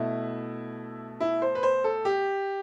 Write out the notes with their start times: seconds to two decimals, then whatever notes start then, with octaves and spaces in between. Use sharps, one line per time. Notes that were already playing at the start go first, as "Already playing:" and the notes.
Already playing: B2 A3 E4
1.20 E4
1.42 C5
1.55 B4
1.63 C5
1.84 A4
2.05 G4